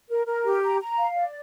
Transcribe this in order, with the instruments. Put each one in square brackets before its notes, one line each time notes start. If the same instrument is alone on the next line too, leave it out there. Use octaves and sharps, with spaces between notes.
[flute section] A#4
A#4
G4
A#5
A#5
F5
D5